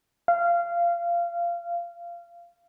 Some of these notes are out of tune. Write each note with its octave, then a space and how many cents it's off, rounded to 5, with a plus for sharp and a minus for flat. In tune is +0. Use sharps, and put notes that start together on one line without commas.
F5 -20